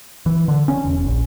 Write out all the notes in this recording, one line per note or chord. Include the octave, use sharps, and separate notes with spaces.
E3
D3
C#4
E1
A#1